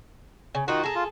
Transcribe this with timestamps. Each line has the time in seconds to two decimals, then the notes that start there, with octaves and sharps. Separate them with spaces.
0.55 C#3
0.68 D#3 D#4 F4 F#4 F#5
0.84 G#4 A4 A#5
0.95 F4